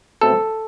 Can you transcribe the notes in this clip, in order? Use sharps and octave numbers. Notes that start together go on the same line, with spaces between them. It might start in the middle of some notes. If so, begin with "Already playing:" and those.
B2 A3 C4 A4